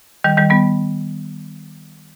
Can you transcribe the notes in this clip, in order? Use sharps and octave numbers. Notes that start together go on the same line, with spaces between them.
D#3 G3
D#3 G3
G3 B3